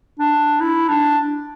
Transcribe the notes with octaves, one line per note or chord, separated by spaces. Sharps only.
D4
E4
D4